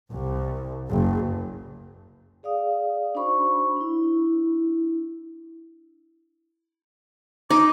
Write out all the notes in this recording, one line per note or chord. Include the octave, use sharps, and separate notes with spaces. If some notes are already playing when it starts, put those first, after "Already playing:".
C2
F#1
G#4 D5 F5 D#6
D4 D#4 F#4 C5 B5 C#6
D4 E4
D#4 D6